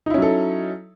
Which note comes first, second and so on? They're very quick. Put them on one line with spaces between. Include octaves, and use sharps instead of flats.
D#4 E4 C#4 F#3 A4